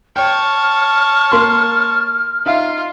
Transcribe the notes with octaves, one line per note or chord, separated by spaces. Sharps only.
C#5 G5 A5 F6
A#3 C6
D#4 F4 E5 F5